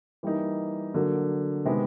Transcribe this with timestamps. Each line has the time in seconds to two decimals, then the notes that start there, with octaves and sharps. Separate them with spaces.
0.23 E3 G3 A#3 D#4
0.94 D3 F#3 A#3
1.65 C3 D#3 G#3 B3